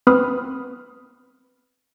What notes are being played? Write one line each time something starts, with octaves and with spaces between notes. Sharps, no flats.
B3 C4 B4 B5 D#6 F6